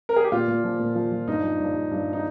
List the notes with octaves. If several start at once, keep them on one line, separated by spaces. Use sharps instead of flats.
A#4
G#4
G4
A#2 F4
A#2
F3
A#2
F3
F3
G2 D#4
F3
G2
G2
G2
D#4